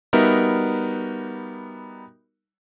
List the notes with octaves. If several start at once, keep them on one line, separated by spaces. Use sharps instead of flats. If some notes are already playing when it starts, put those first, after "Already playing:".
G3 B3 D#4 F#4 A#4 E5